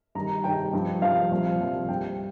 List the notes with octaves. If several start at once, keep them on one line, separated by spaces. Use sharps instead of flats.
G2 D#3 G3 A#5
G2 D#3 G3 G5
G2 F3
G2 F3 F5
C2 A#2 F3
C2 A#2 F3
G2 G3 G5